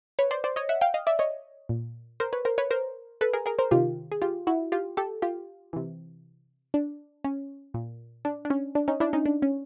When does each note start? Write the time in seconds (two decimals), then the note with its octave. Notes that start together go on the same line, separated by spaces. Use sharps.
0.19 B4 C#5
0.31 C5 D5
0.44 C5 D5
0.56 C#5 D#5
0.69 E5 F#5
0.81 F5 G5
0.94 D#5 F5
1.07 D5 E5
1.19 C#5 D#5
1.69 A#2
2.20 A#4 C5
2.33 B4 C#5
2.45 A#4 C5
2.58 B4 C#5
2.71 A#4 C5
3.21 A4 B4
3.33 G#4 A#4
3.46 G#4 A#4
3.59 A#4 C5
3.71 C3 D#3 F4 G4
4.12 G#4
4.22 F4 G4
4.47 E4 F#4
4.72 F4 G4
4.97 G4 A4
5.22 F4 G4
5.73 C3 E3
6.74 D4
7.24 C#4
7.74 A#2
8.25 D4
8.45 D4
8.50 C#4
8.75 D4
8.88 C#4 D#4
9.00 D4 E4
9.13 C#4 D#4
9.26 D4
9.42 C#4